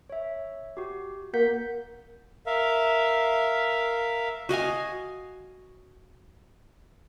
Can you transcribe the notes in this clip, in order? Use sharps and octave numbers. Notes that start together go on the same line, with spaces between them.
C#5 E5
F#4 G4
A#3 F#5 G6 B6
A#4 E5 F5
F#4 D#5 F5 G#5